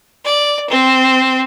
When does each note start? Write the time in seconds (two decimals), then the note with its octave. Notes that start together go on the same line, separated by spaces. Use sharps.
0.25 D5
0.70 C4